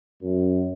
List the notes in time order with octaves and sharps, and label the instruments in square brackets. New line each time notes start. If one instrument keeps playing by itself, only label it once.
[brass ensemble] F#2